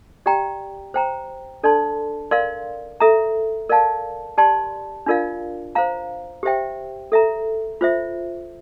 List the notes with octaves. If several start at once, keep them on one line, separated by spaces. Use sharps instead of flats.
G4 D5 G5 A#5
C5 G5 A#5
D4 A4 D5 A5 C6
A#4 D5 F5 C6
A4 E5 A#5
A#4 D5 F5 A5
G4 D5 A5 C6
D4 F4 A#4 D5 F5
C5 F5 A#5
G4 C5 E5 G5
A4 E5 A#5
F4 C5 E5